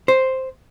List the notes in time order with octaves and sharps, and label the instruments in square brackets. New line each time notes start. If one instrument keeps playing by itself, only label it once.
[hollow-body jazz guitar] C5